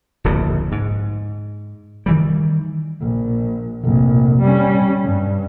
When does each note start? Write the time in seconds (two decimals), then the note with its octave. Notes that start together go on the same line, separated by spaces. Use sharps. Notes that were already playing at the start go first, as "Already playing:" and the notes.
0.24 D1 A#1 C#3
0.72 G#2
2.06 D#3 E3 G3
3.00 A#1
3.83 F1 A#1
4.42 G3 C#4
5.04 G2